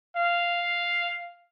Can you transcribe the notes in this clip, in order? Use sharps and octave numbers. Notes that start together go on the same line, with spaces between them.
F5